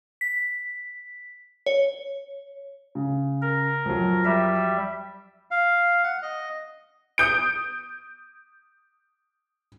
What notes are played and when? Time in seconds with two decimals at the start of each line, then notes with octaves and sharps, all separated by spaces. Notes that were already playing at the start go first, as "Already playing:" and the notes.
0.21 B6
1.66 C#5
2.95 C#3
3.42 A#4
3.86 F2 F#3
4.25 G3 E5
5.51 F5
6.04 F#5
6.22 D#5
7.18 D#6 G6 D7